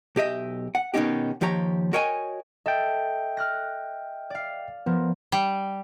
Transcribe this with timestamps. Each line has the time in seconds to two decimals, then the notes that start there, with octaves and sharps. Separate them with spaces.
0.16 B1 G4 D#5 E5
0.75 F#5
0.94 B2 D#3 G#3 C#4 D#4 G4
1.41 D#2 F3 G4 C#5 A#5
1.93 F#4 A#4 C#5 D#5 G5 G#5
2.66 A4 D#5 E5 G5
3.37 F6 F#6 A#6
4.30 D5 F5
4.86 F3 B3 A#4
5.32 G3